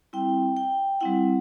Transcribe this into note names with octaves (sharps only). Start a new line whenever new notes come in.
G3 C4 E4 G5
G5
G3 C4 E4 F#5